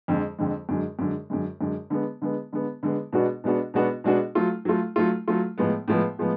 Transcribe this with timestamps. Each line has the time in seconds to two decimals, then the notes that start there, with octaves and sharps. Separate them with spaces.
0.08 F2 D3 G#3
0.39 F2 D3 G#3
0.69 F#2 D3 G#3
0.99 F#2 D3 G#3
1.30 F#2 D3 G#3
1.61 F#2 D3 G#3
1.90 D3 G#3 B3
2.22 D3 G#3 B3
2.53 D3 G#3 B3
2.83 D3 G#3 B3
3.13 B2 G#3 B3 D4 F#4
3.44 B2 G#3 B3 D4 F#4
3.74 B2 G#3 B3 D4 F#4
4.04 B2 G#3 B3 D4 F#4
4.35 F#3 A3 F4
4.65 F#3 A3 F4
4.96 F#3 A3 F4
5.28 F#3 A3 F4
5.58 A2 F3 G#3 B3
5.88 A2 F3 G#3 B3
6.19 A2 F3 G#3 B3